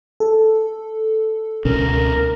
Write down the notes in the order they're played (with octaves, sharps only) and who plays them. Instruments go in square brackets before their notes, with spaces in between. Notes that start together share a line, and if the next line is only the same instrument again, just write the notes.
[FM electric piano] A4
[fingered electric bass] C#2 B2 C#4 [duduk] A#4